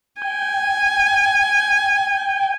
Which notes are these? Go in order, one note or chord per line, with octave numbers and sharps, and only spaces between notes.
G5 G#5